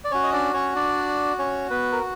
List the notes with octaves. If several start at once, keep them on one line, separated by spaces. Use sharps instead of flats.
D5
C#4 F#4 C#5
D#5
D4 D5
C#4 C#5
D4 D5
C#4 C#5
B3 B4
A#4